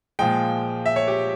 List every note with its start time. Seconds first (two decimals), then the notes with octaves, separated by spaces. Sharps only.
0.19 A#2 F3 G#3 G5
0.86 E5
0.96 C#5
1.08 G4